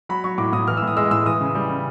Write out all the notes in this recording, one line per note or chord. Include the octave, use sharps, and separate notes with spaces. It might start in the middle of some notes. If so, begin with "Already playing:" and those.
F#3 B5
F#3 C#6
A2 D6
A2 D#6
E3 F6
E6
A2
D#6
G#3 E6
A2 E6
E3 D#6
C#3
G3
C#3